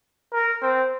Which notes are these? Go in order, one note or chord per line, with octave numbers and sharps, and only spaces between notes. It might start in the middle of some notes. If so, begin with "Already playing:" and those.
A#4
C4